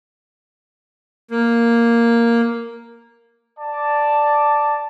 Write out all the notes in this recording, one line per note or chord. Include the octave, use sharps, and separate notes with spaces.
A#3
D5 A5